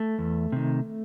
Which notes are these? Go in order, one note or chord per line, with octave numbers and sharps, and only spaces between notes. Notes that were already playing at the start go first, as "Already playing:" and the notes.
Already playing: A3
E2
C3 D#3